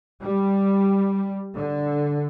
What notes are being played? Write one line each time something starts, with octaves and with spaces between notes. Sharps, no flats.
G3
D3